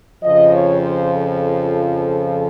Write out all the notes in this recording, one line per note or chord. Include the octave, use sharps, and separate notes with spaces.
F2 C#3 F3 D#5
C#5
C5
A4